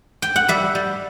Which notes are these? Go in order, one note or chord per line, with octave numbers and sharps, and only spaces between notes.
G5
F#5
G3 E5
G3